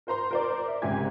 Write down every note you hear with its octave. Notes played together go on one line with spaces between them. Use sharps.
A#4 C5 A#5 C6
A#4 C5 D5
E5
C2 G#2 C#3 G4 G#5 G#6